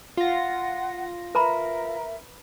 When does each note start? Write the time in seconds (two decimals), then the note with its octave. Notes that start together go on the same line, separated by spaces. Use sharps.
0.17 F4 F#5 A#6
1.35 A#4 B4 E5 A#5 B5